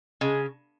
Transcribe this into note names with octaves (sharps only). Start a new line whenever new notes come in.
C#3 G#3